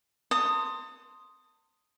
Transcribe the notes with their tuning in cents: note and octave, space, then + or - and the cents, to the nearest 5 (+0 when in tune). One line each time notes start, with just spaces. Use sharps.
A5 +40 C6 +0 D#6 +0